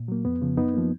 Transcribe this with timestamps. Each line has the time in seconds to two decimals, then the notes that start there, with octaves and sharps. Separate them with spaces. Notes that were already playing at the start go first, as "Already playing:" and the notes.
Already playing: A#2
0.08 F#3 A#3
0.25 F2 B3
0.42 C#3 F3
0.57 F#2 B3 D#4
0.74 F3 A#3